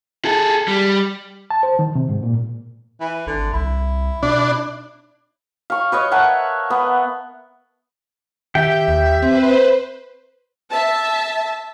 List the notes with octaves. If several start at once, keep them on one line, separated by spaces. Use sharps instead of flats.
G#4 A4
G3
A5
C5
D#3
C3
G#2
A#2
E3
G#1 D3
C2 E4
B2 D4
F5 C#6
B4 C#5 D#5
A#4 E5 F#5 A5
B3
D#3 G4 E5 G5
D#2
C4 B4 C5
E5 A5